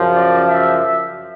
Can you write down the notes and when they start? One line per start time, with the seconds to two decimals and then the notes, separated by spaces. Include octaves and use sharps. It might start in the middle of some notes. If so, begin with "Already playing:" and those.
Already playing: F#2 C#3 F3
0.16 D5
0.46 E5